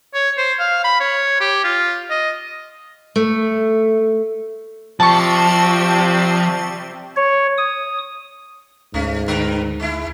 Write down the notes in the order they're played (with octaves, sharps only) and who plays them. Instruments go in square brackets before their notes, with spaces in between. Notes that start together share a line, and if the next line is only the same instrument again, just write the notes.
[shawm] C#5
C5
F5
B5
C#5
G4
F4
D#5
[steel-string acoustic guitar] A3
[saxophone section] C3 G3 C4 [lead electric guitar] F3 [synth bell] A5 C#6
[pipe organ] C#5
D#6
[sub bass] D2 [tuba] G#2 [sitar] A3 C#4
[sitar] D3 A#4 B4
G#3 E4